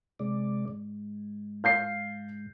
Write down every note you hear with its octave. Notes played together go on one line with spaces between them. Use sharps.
C3 G#3 D5
G#2
F5 G6 C7